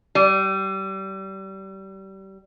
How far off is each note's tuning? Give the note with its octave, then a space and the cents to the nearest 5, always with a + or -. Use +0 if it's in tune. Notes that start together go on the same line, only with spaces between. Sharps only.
G3 -25